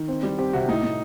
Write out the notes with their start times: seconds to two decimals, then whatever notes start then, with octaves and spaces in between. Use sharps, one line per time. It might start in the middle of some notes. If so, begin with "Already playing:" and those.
Already playing: D#3
0.08 C4
0.23 G3
0.38 C4 G4
0.53 C3 F#4
0.68 A2 D#4
0.83 A2